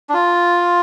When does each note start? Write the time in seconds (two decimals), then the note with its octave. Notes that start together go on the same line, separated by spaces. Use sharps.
0.09 D4
0.14 F4